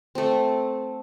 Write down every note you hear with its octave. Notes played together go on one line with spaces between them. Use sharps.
A3 C4